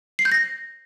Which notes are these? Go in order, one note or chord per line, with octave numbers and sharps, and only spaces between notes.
C7
G6
A#6